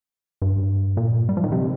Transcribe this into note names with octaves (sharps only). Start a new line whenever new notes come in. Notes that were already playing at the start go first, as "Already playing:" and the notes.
G2
A#2
G3
F3
D#3
C3